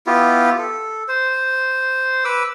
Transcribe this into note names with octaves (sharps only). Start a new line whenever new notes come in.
B3 E4 F4 G4
A4
C5
B4 D6 E6